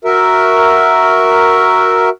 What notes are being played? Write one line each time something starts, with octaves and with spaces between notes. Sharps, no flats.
F#4 A#4 E5